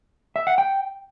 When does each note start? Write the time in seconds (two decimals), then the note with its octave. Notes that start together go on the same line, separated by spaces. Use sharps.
0.36 E5
0.47 F#5
0.58 G5